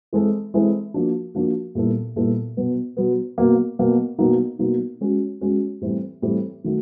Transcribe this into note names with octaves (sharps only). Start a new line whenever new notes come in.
E3 G#3 C4 E4 A4
E3 G#3 C4 E4 A4
F3 A#3 D4 F#4
F3 A#3 D4 F#4
A#2 G3 B3 E4 A4
A#2 G3 B3 E4 A4
B2 F#3 B3
B2 F#3 B3
B2 F#3 A#3
B2 F#3 A#3
B2 F#3 A#3 D#4
B2 F#3 A#3 D#4
G#3 C#4 F#4
G#3 C#4 F#4
A2 E3 G3 C4
A2 E3 G3 C4
D#3 F#3 A3